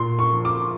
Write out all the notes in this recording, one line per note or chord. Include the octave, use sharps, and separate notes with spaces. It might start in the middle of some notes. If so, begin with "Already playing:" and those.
Already playing: A#2 C6
C#6
F3
D6